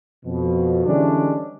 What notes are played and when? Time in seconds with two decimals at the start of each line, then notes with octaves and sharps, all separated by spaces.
0.25 F2 B2
0.86 D3 E3 G3 G#3 C#4 D4